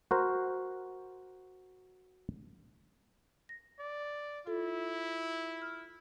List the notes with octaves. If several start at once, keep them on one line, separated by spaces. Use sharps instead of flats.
F#4 A#4 C5
A#6
D5
E4 F4 A4
F6